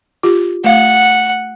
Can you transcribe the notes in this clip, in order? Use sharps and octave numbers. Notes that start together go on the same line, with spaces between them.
F4 G4
A3 F5 F#5